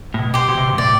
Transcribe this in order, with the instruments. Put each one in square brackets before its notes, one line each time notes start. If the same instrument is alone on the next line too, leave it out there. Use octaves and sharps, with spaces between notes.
[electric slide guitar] A2
B2
[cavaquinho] G4 C5
[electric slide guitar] B2
C3
B2
G2
[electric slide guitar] A2 [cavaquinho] D5